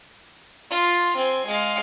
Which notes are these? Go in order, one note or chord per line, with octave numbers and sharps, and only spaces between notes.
F4
C4 G#5
G#3 F5